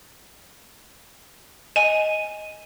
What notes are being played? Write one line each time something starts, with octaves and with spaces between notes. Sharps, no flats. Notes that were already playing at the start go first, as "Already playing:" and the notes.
D#5 G#5 D#7